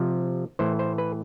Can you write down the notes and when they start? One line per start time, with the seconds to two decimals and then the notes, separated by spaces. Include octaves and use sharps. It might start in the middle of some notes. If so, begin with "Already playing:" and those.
Already playing: C3 F3
0.59 A2 E3 C5
0.79 C5
0.98 B4